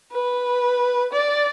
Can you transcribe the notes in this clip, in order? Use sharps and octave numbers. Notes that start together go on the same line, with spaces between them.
B4
D5